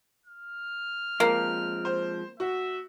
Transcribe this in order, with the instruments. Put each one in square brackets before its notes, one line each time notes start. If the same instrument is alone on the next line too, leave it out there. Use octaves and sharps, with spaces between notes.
[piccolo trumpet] F6
[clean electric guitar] F3 G#3 C4 [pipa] A#3
[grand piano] C5
[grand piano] F#4 [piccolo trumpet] E5